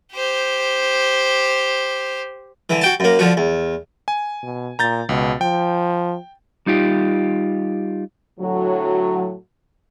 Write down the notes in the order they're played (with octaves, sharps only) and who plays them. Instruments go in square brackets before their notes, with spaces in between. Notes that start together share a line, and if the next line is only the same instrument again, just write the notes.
[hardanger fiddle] G4 C5
[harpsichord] D3 E3
F#4 G5 A5
F#2 A#3
D3 F3 F#4
E2
[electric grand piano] G#5
[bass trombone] B2
[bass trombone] A#2 [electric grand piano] A#5 G6 A6
[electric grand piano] C#2 [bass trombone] B2
[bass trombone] F3 [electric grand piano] G5
[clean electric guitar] G3 D#4 F4 G4
[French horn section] A2 D3 F#3